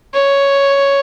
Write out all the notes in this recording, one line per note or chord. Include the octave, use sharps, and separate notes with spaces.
C#5